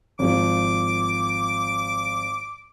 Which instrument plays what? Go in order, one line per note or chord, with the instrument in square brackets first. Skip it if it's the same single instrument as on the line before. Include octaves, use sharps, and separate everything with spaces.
[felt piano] G#1 F3 [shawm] D6